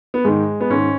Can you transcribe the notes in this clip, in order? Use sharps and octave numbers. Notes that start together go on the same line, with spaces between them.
B3
G#2 D#3 G#3
B3
G#2 D#3 C#4